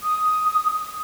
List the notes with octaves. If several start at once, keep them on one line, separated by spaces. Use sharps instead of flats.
D#6